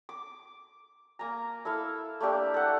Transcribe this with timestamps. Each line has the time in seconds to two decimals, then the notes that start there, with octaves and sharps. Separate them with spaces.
0.09 D6
1.19 A#3 G#5 A#5
1.65 E4 A4 E5 F5
2.21 A3 A#3 D4 G4
2.54 A4 F#5